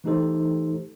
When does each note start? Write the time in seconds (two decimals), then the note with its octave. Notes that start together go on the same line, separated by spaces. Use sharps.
0.04 E3 A3 D#4 G4 A4 C5